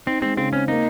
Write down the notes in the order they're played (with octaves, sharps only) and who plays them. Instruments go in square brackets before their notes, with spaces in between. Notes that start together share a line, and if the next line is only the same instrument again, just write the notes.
[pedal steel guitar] C4 [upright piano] D#4
[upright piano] G#3 [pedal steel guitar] C4
[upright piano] C#3 [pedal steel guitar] C4
[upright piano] C4 [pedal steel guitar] C#4
[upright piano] A#3 [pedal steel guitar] D#4